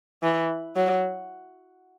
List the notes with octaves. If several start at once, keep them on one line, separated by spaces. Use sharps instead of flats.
E3
F#3